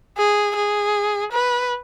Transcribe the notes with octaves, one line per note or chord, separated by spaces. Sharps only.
G#4
G#4
B4